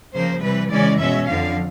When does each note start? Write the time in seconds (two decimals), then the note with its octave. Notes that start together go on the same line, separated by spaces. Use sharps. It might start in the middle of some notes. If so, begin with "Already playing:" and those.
0.13 C#3 F3 A#3 C5
0.41 C3 E3 G3 B4
0.71 C#3 E3 G#3 C#4 D5
0.99 B2 G#3 C#4 E5
1.28 F2 D3 F3 F5